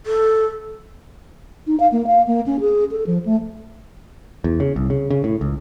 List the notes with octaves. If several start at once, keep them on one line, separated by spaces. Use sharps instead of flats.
A4
D#4
F5
A#3
F5
A#3
C#4
G#4
A4
F3
A3
E2
C#3
C2
C#3
C#3
A2
C#2